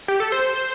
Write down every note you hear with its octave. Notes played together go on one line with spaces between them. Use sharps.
G4
A4
C5